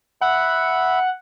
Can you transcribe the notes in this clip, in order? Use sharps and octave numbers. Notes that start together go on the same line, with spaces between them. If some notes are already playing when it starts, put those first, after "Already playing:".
E5 F#5 B5